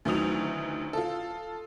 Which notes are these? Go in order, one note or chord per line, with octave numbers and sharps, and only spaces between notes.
D2 D#3 E3 F#3 D#6 F7
F4 A4